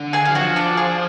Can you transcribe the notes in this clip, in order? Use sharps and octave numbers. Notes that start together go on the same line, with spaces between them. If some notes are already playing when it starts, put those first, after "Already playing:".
Already playing: D3
G#4 G#5
F#3 F5
F3 F#4 F#5
D4 D5
G#4